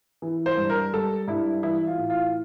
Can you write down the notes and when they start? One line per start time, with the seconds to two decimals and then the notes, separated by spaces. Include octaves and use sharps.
0.22 E3
0.46 C5
0.57 G2
0.70 A#4
0.93 G3 A4
1.28 G2 E4
1.63 E3 E4
1.87 F4
1.98 A2
2.10 F4